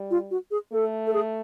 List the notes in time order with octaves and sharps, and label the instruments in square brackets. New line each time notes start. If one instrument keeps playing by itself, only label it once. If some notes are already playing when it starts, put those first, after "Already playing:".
Already playing: [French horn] G3
[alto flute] F4
F#4
G#4
[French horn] A3 [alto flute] A4
[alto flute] A4
G#4